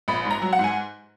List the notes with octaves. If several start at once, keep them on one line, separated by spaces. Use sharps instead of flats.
A#1 B5
G#2
A#5
F#3
F#5
G#2
G#5